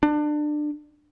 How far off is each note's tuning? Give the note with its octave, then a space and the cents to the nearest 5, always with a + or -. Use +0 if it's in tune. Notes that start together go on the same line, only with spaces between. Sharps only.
D4 +25